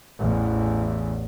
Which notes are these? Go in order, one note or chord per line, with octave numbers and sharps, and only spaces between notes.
A1 E2